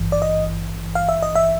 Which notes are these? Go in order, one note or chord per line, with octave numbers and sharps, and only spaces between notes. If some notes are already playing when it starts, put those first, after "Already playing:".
Already playing: G#1 G2 E3
D5
D#5
F5
E5
D#5
E5